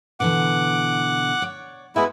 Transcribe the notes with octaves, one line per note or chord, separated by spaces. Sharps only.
B2 D3 E3 F#5 D6
C#5 D5
G#3 B3 E4 F#4 B4 E5